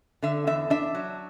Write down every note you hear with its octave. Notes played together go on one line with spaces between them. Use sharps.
D3 E5
E2 E5
D4 E5
F#3